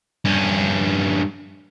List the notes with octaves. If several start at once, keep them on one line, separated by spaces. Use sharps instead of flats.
G2 C#4